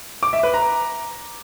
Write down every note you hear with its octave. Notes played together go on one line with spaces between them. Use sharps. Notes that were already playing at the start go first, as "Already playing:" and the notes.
D6
E5
B4
A#5